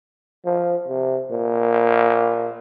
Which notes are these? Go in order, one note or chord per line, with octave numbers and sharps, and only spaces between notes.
F3
C3
A#2